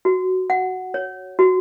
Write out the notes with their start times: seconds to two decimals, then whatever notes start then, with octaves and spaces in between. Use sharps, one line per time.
0.05 F#4
0.50 F#5
0.94 C#5
1.39 F#4